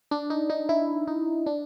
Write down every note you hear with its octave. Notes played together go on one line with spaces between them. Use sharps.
D4
D#4
D#4
E4
D#4
D4